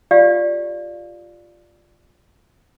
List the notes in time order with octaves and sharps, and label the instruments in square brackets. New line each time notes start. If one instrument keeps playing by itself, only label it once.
[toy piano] F4 G4 D5 F5